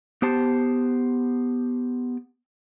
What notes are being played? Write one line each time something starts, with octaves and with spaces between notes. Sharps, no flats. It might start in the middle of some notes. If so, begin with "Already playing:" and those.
B3 G4 C5 A5